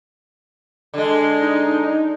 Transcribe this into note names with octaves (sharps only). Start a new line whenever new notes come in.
D3 G#3
D#4